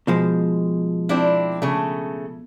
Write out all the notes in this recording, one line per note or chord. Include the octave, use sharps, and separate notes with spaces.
B2 F3 G#3
C4 D4 E4
C#3 A3